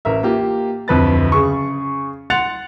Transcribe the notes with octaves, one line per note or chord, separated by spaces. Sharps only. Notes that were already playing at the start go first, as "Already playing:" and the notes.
A1 A#4 E5
A#3 F4 G4
D1 F2 B4 A6
C#3 G#4 C#6
F#5 C6 F#6 A6 C#7 F7